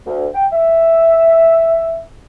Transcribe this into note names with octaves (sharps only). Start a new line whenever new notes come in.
D2
G5
E5